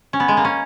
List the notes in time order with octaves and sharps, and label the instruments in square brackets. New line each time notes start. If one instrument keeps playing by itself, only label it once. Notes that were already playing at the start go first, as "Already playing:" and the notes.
[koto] C#4
B3
G#3
A#3
C#4